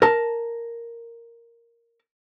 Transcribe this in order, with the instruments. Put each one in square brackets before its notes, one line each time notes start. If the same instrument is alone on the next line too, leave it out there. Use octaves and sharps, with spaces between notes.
[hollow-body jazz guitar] A#4 A5